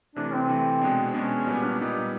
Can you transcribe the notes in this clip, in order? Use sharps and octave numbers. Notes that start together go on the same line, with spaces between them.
C3 E3 A3 D4
C4
C3 E3 A3
B2 G#3 B3 D4
B2 G#3 B3 C#4 D4
A#2 G3 B3 C#4
D4
A#2 G3 B3 D#4